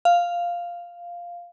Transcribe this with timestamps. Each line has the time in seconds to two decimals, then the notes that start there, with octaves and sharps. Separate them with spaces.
0.05 F5